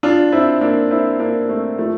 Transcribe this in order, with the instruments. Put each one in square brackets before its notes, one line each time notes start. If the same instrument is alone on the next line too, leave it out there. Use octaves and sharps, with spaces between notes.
[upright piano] D4 F4
C4 E4
A#3 D4
C4 E4
A#3 D4
A3 C4
F3 A3